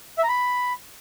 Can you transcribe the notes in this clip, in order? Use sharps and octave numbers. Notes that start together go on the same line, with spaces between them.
E5
A#5
B5